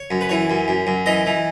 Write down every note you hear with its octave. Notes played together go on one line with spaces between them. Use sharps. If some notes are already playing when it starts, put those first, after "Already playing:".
Already playing: C#5
F#2
B4
E3 C#5
F#2
F#2
F#2
E3 D#5
E3